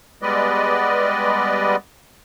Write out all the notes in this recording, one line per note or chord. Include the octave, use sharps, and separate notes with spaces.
G3 G#3 B3 B4 D5 D#5